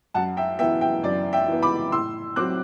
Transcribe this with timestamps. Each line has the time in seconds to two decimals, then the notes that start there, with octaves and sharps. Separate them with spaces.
0.14 F#2 F#5 A5
0.37 E5 G5
0.59 E3 B3 E5 G5
0.81 E5 G5
1.03 F#2 D5
1.33 E5 G5
1.48 E3 B3
1.63 B5 D6
1.92 A2 C6 E6
2.36 F#3 C4 D6 F#6